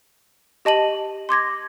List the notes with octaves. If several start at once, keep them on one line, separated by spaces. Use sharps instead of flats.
G4 D#5 A5 D#7 F#7
C6 D6 G#6 A#6